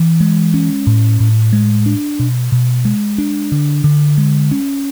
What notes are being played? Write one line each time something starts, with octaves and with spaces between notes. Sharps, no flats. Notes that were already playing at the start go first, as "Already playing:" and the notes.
Already playing: E3
G#3
C#4
A2
A2
G#3
D4
B2
B2
G#3
D4
D3
D3
G#3
C#4